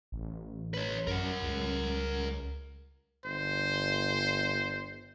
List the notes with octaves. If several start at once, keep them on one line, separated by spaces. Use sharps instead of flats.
A1
B4 C#5
F#2 A#4 F#5
C#2
G1 C5